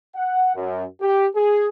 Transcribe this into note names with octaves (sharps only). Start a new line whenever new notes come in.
F#5
F#2
G4
G#4